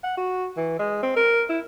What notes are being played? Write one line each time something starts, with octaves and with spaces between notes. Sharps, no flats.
F#5
F#4
E3
G#3
C4
A#4
E4